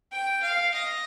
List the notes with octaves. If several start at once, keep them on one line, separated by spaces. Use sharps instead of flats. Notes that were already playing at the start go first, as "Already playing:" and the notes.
G5
F5
D#5